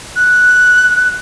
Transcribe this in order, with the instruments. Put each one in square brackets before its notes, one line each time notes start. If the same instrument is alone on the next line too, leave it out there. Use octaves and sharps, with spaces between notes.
[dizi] F#6